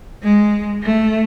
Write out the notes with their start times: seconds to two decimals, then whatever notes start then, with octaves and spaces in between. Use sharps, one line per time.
0.23 G#3
0.83 A3